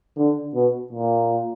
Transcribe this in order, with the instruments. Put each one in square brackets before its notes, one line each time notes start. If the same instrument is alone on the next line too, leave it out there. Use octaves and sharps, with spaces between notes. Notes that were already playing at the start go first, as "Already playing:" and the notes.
[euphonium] D3
B2
A#2